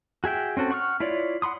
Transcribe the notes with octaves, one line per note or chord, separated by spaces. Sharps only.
F#4 G#4 E5 G5
C4 C#4 F#4 A4
F#5 C#6 D6 F6
E4 F4 C#5 D5
F#5 B5 C6 D#6